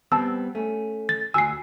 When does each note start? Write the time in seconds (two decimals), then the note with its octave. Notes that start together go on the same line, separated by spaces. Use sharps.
0.12 G3 B3 C4 A5 E6
0.55 A3 C#4
1.09 A6
1.34 D2 F#4 G#5 E6 C7